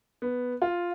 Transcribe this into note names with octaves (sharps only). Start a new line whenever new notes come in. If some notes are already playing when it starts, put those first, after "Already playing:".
B3
F4